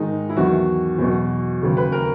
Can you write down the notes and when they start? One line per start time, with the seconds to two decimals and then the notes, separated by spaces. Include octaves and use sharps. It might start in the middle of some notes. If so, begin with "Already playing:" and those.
Already playing: G#2 D#3 G#3 D#4
0.29 E4
0.36 E2 D#3 F#3 F#4
0.98 E2 B2 F#3
1.61 D#2 C#3 F#3
1.77 B4
1.92 A#4